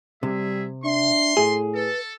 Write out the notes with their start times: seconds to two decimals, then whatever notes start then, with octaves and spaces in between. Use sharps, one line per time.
0.23 C3 G3 G#4 E5
0.84 D4 E5 C6
1.37 A2 G#4
1.74 A4 B4